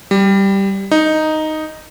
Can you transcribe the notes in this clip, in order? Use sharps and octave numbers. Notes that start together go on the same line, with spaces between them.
G3
D#4